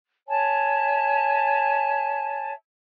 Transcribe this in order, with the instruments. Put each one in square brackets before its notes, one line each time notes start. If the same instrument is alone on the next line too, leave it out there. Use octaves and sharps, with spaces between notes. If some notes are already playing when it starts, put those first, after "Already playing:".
[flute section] C#5 E5 G#5 A5